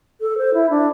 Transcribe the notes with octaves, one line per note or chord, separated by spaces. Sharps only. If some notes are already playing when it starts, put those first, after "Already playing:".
A4
C5
E4
D4